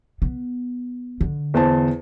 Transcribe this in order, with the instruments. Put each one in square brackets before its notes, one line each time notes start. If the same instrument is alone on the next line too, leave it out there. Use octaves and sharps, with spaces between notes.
[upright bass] B3
D3
[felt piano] E2 C5 A5